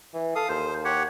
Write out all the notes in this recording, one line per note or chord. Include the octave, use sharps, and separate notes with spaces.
E3
A4 F5 D#6
D#2 C5
G4 C#5 F#5